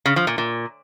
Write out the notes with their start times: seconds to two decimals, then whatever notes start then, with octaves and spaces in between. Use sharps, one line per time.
0.06 C#3
0.16 F3
0.27 A#2
0.38 A#2